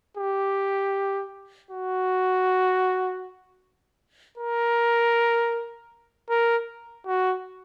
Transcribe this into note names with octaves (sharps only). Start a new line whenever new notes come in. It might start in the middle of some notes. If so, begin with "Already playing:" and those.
G4
F#4
A#4
A#4
F#4